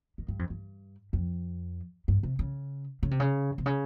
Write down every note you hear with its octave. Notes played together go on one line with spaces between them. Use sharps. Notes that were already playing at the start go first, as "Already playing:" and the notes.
D#3
G2
F2
G2
F2
G2
C3
C#3
C#3
C3
C#3
C3
C#3